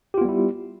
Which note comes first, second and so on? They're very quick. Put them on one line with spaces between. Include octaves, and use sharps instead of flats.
G4 F4 B3 G3 E4